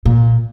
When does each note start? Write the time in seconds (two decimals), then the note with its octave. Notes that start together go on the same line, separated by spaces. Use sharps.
0.05 A#2